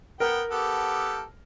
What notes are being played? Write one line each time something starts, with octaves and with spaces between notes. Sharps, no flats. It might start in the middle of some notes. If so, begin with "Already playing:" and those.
B3 A#4 G5
B3 G4 A4